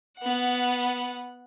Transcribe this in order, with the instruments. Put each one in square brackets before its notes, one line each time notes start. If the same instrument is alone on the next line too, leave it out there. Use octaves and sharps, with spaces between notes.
[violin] B3 F#5